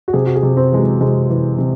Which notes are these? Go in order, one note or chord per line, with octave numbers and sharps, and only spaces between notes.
F#4
C3 G#4
F#4
G#4
C3
C4
E3 G#3
F#3
C3 G#3
E3
C3